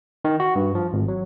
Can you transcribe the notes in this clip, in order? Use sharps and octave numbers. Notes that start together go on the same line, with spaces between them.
D#3
F#4
G2
F3
G#1
F#3